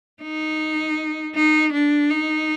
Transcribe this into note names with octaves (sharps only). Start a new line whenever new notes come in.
D#4
D#4
D4
D#4